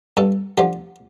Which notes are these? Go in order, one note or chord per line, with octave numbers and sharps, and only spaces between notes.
G2 A4
D3 F3 G4